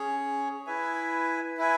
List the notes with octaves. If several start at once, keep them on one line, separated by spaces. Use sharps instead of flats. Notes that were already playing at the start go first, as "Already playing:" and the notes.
Already playing: C#4 G#4 C#5
E4 B4 E5 G#5
E4 B4 E5 G#5